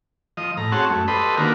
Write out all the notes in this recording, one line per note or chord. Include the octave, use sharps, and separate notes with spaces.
F3 D#5
A2 A#5
C4 F#4 G#4 C#5 F#5 A5
F#2 A3
G4 A4 B4 C5 D#5 B5
D3 D#3 A#3 F#4 A#4 B4